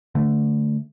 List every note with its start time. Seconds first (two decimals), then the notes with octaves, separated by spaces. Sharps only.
0.15 D3 A3